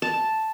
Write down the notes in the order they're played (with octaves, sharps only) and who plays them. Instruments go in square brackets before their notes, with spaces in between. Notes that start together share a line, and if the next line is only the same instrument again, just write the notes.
[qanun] A5